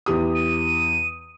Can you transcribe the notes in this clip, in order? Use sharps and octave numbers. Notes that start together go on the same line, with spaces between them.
E2 G4 D#6
D#7